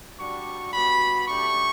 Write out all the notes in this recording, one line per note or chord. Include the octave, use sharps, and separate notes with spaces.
G3 D4 F#4 C#6
G3 B3 F#4 B5
A3 D4 G4 C#6